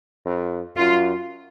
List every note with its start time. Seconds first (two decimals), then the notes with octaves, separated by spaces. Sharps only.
0.26 F2
0.76 F#2 F4